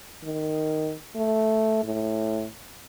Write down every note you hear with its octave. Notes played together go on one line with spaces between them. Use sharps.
D#3
A3
A2